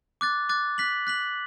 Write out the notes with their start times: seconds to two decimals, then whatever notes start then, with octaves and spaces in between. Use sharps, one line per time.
0.21 D6 F#6 A6
0.49 D6 F#6 A6
0.78 F#6 B6 F#7
1.07 F#6 B6 F#7